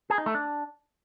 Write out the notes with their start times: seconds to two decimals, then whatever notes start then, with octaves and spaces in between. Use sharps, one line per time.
0.10 G#4
0.18 D#4
0.26 A3
0.35 D4